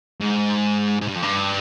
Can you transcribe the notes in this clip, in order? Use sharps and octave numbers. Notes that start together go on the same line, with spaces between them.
G#2
G#2
G2
F2
G2